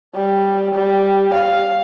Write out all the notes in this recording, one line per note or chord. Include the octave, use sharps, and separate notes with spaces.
G3
G3
F5